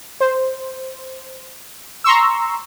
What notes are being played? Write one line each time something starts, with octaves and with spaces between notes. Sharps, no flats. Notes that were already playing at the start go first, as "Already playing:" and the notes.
C5
A#5 C6 C#6 E6